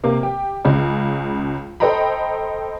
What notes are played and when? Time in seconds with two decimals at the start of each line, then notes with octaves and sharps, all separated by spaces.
0.04 C3 A#3
0.23 G4
0.65 C#2 C#3
1.80 A4 C5 D#5 G5 A#5 B5